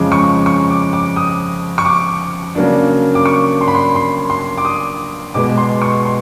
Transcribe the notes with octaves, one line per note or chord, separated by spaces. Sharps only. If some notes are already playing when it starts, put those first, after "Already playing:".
Already playing: F2 C#3 F3 G#3 C#4 D6
C#6
C#6
D6
D6
D#6
C#6
D6
C#3 F#3 A#3 D4
D6
C#6
C6
B5
C6
C6
C6
D6
D#6
B2 G#3 B3 D6
C6
C#6
C6